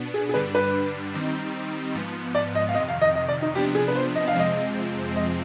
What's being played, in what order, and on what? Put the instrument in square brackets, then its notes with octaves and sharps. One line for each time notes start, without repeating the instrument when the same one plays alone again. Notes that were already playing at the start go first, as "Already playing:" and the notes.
Already playing: [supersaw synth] B2 B3 D4
[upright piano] G#4
G#4
[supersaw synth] G2 D3 G3 D4 [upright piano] B4
[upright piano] B4
[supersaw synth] D#3 G3 C4 D#4
G#2 F3 B3
[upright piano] D5
D#5
F5
[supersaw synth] F2 C3 D#3 [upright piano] D#5
[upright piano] F5
D#5
D#5
D5
D#4
[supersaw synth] C3 F3 B3 D4 [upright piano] G4
[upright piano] G#4
B4
C5
D#5
F5
[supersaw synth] F2 C3 F3 G#3 C4 [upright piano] D#5
[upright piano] D#5